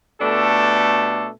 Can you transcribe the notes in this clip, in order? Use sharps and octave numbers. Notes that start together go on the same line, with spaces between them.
B2 A3 D4 G4 A4